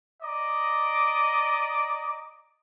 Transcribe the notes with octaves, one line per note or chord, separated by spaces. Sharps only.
D5 D#5 A#5 D6